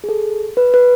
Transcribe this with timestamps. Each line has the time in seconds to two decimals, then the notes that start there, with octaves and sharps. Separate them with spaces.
0.04 G#4
0.09 A4
0.57 B4
0.74 B4